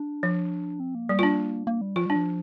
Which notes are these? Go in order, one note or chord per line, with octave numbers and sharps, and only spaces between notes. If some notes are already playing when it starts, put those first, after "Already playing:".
Already playing: D4
F3
C4
A#3
G3
F4
D4
A#3
G3
F3 F4
G3 D4
F3